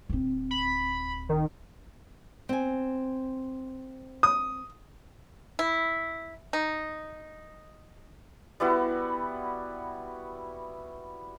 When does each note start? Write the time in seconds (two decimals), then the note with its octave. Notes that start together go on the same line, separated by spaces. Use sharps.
0.09 D1 C4
0.51 B5
1.29 D#3
2.49 C4 G#5
4.23 D#6
5.59 E4
6.53 D#4
8.60 G3 B3 E4 F#4